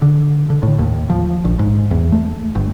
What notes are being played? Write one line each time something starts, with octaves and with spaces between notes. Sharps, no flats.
D3
D3
A2
D#2
F3
A#1
G#2
E2
A3
G1